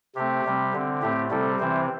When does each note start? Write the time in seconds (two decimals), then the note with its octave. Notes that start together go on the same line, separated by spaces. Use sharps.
0.15 C3 A3 C4 G4
0.45 C3 G3 C4
0.73 D3 C4
1.02 A2 A3 C4 G4
1.31 C3 G3 C4 A4
1.60 C3 E3 C4 C5